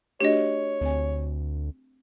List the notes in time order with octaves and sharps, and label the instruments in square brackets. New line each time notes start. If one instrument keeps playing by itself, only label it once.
[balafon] A3 D4 F#4 [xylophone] G4 D#5 [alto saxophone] C#5
[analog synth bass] D2 [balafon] C4 G#5